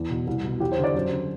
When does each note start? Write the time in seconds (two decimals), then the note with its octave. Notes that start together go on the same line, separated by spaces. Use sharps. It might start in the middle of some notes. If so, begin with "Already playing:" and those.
Already playing: E2
0.10 B2
0.27 C2
0.44 B2
0.60 E2 G4
0.72 C5
0.78 D3
0.84 D5
0.95 F#2 C5
1.12 D3